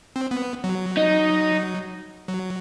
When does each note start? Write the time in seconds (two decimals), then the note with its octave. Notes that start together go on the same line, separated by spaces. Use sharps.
0.16 C4
0.31 B3
0.64 F#3
0.97 D#4
2.28 F#3